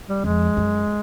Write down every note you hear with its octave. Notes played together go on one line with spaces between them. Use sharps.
G3
F2 G#3
F#2